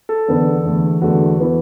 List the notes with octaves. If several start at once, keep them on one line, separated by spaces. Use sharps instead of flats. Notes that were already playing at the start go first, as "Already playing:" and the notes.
A4
E2 D3 B3 D4
E2 D3 A3
E2 D3 A3 F#4
E3 B3 E4